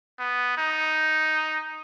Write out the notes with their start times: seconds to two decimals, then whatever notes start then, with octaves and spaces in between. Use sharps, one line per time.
0.19 B3
0.58 D#4